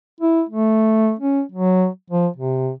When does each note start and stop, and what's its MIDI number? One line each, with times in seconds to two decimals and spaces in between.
0.21 0.43 64
0.49 1.13 57
1.20 1.42 61
1.52 1.87 54
2.10 2.28 53
2.37 2.70 48